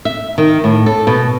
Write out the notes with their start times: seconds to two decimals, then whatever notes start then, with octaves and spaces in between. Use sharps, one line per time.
0.05 E5
0.38 D#3
0.64 A2
0.86 A4
1.07 B2